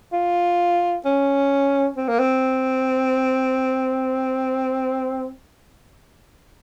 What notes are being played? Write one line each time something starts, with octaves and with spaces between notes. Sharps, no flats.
F4
C#4
C4
A#3
C4